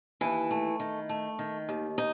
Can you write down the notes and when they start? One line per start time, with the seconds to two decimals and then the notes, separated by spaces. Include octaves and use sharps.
0.21 D#2 E3 E4
0.51 A3
0.80 D#3
1.09 A3
1.39 D#3
1.69 D#2
1.98 D#4